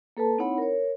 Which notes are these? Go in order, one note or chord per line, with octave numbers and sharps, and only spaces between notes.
A#3 A4 B4 A5
C4 D#4 E4 C#5 F#5 B5
A#4 C#5